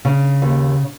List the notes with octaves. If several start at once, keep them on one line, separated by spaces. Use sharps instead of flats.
C#3
D#2